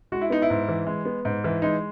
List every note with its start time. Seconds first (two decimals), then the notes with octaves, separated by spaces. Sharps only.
0.12 G#3 F#4
0.21 E4
0.30 B3 D#4
0.42 E4
0.50 G#2
0.68 E3
0.87 G#3
1.05 B3
1.25 G#2
1.44 E3
1.62 G#3 D#4